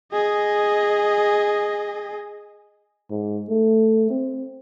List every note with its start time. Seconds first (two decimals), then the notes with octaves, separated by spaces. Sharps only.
0.12 G#4 D#5
3.10 G#2
3.49 A3
4.10 C4